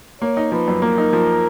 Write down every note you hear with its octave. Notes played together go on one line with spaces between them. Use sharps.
A#3 C#5
D#4
F3 B4
F#2
A#3 A#4
D#4
F3